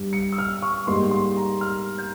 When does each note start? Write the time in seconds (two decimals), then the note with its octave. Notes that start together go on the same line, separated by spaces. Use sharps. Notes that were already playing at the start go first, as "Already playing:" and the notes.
Already playing: G2 G3
0.13 C#7
0.32 E6
0.38 F6
0.62 C#6
0.87 G#2 G3 A#3 C6
1.11 C6
1.37 A#5
1.61 F6
1.98 G6